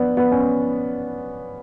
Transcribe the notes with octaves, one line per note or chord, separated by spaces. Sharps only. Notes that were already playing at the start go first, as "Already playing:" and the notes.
Already playing: B3 D4
B3
C#4